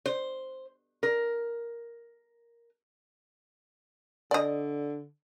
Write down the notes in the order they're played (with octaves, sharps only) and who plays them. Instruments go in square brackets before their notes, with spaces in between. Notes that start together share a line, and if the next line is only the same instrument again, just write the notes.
[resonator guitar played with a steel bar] C5
A#4
[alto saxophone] D3 [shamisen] D5 D#5